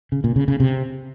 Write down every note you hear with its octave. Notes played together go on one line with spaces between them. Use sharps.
C#3
A#2
C#3
C#3
C3